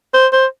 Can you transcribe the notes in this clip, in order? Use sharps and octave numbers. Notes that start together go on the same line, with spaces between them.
C5
C5